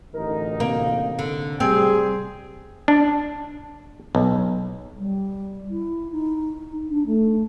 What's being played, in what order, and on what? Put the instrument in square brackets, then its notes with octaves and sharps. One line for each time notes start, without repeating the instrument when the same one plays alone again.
[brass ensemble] A1 D2 D#4 [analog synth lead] A#4
[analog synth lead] C3 [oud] A#3
[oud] D3
[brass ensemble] G3 G#4 [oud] C4
[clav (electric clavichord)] D4
B1
[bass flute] G3
E4
D#4
D4
A3